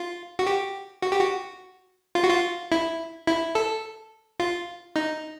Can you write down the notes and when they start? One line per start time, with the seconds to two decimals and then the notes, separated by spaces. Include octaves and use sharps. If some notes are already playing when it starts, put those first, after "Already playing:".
Already playing: F4
0.39 F#4
0.47 G4
1.02 F#4
1.12 G4
1.21 F#4
2.15 F4
2.23 F#4
2.30 F4
2.72 E4
3.27 E4
3.55 A4
4.40 F4
4.96 D#4